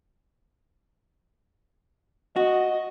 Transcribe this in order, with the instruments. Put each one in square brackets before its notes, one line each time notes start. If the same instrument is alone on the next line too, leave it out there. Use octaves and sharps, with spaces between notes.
[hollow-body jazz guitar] F#4 [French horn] D#5